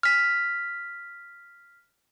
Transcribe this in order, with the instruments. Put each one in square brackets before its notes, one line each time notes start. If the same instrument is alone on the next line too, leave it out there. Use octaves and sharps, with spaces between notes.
[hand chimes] F6 B6